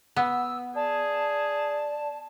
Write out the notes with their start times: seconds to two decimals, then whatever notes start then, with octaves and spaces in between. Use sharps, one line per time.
0.16 B3 E6
0.75 G#4 D5 A5